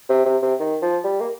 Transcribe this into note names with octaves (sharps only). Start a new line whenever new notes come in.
C3
C3
C3
D#3
F3
G3
A#3